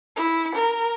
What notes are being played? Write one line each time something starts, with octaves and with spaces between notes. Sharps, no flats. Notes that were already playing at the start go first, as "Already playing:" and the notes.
E4
A#4